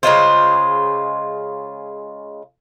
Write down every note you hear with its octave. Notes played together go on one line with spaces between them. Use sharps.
C#3 G#3 F4 C5